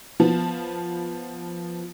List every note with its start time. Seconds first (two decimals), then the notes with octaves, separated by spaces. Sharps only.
0.20 F3 B3 A5